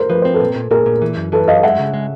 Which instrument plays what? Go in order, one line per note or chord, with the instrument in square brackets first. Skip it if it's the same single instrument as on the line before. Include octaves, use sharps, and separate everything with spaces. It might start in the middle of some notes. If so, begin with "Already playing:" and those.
Already playing: [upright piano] A#4 C5
[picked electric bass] F3 [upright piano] B4
[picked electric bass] C4 [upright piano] C5
[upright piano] A4 B4
[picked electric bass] A#2
A#2
[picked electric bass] A#2 [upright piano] G#4 A#4
[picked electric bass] A#2
E3
F#2
[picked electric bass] E3 [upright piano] A4 B4
[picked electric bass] F#2 [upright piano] D#5 F5
[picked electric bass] G#3 [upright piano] E5 F#5
[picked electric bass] C#3
G#3